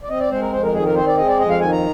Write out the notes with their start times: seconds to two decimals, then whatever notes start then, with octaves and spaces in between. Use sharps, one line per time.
0.03 D5
0.09 C4 D#5
0.20 D5
0.31 G#3 C5
0.42 A#4
0.52 F2 C5
0.63 A#4
0.74 D#3 G#4
0.85 A#4
0.96 C4 C5
1.07 D5
1.17 G#3 D#5
1.28 D5
1.39 F2 D#5
1.50 F5
1.60 D#3 G#5
1.72 A#5